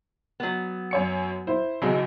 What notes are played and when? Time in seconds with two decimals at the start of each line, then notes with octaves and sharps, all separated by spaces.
0.40 F#3 B3
0.91 F#2 C#5 C#7
1.47 E4 C5
1.82 B1 C#3 E3 F#3 G#3